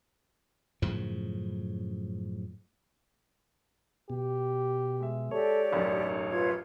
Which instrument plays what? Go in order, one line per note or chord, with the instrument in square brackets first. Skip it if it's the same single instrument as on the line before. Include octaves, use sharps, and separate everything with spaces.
[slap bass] F#2 A2 C#3 F3
[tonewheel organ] B2 [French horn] G4
[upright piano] G#3 E5
[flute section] G4 D5 [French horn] A4 [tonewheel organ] C#5
[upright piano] E1 A1 F#2 [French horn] D#4
[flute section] F4 B4 G#6